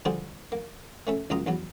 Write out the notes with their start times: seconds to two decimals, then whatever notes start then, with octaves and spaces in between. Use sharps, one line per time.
0.05 D3 F3 G3 G#4 C5
0.52 A#3
1.07 A3 C#4 A4
1.30 C#2 F#2 A#2 F4 A#5 D#6
1.47 E2 G2 F#3